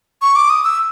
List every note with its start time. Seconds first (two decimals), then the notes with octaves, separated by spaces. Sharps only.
0.22 C#6
0.36 D6
0.50 D#6
0.64 E6